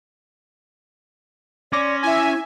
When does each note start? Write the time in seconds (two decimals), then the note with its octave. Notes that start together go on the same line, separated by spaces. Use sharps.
1.73 C#4 D5 C6 D6 A#6
2.03 E4 E5 G#5